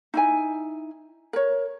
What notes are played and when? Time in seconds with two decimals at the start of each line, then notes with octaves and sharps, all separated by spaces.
0.14 D#4 E4 G#5
1.33 A#4 C#5